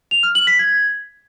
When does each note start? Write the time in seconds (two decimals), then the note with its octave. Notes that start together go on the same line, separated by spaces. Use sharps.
0.11 F7
0.23 F6
0.35 F#7
0.47 B6
0.59 G#6